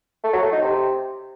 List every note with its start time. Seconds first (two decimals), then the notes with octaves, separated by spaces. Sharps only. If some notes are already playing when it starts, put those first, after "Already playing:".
0.23 A3
0.33 F#3
0.42 A3
0.52 D#4
0.62 C3